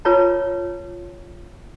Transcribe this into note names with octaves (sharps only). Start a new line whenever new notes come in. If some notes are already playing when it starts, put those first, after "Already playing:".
F4 A#4 B4 C#5 A5 A#5